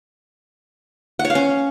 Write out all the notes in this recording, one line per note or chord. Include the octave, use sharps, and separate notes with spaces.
F#5
C#5
F5
C#4